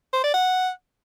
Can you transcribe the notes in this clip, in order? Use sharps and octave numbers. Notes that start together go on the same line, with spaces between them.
C5
D5
F#5